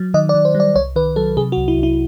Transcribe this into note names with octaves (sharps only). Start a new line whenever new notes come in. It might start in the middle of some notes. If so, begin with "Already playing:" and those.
Already playing: F#3
D#3 D#5
D5
D#3
C5
G3
D5
C2 C#5
D#3 B4
F#3 A4
C3 G#4
F#4
C2
E4
C2 E4